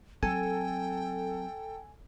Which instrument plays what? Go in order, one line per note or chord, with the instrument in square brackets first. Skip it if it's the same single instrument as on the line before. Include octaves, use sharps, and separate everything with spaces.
[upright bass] F#3 C4 [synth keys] A4 [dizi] G5 [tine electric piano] G#5